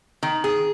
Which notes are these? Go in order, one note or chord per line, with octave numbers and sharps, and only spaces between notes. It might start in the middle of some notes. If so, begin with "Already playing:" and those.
D#3
G#4